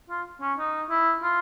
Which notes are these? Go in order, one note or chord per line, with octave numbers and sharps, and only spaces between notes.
F4
C#4
D#4
E4
F4